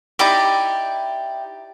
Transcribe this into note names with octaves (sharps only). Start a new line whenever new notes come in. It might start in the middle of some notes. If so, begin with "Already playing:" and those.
D#4 E4 G4 D5